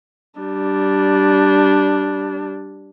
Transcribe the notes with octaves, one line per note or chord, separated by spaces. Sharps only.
G3 D4